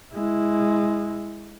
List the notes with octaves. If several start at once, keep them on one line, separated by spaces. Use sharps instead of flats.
G#3 E4